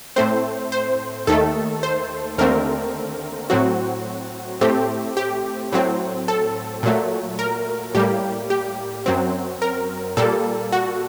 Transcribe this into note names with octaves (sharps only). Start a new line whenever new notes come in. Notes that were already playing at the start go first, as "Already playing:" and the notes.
A2 A3 C4 C5
C5
D#2 D#3 A3 A4
C5
D#2 D3 A3 C4 A#4
A2 F#3 C4 F#4
A2 A3 C4 G4
G4
A2 F#3 C4
A4
A#2 F#3 A3
A#4
A2 G3 A#3 G4
G4
F#2 F#3 C4
A#4
A#2 G3 A#3 A4
F#4